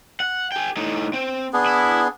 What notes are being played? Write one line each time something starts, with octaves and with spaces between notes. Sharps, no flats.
F#5
G#4 G5
A2 D#4
C4
B3 D4 G#4
E4